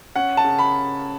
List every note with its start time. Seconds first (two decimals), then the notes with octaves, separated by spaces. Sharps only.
0.16 C#4 F#5
0.37 A5
0.44 C#3
0.59 B5